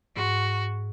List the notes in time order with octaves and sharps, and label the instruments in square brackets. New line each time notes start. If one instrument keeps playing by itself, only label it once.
[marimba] G#2 [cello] F#4